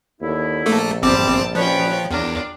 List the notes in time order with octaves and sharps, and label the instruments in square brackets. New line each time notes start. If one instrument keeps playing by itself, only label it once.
[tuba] D#2 [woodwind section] D3 D#4 E4
[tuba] A#1 [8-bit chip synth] A3 A#3 A4
[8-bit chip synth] G1 C4 D6 [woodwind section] C3 E3 G3 [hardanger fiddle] A5
[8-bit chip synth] F3 [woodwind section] G3 C#4 B4 [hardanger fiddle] C#5 G5
[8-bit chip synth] E2 [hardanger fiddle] D4 F4 [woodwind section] A#4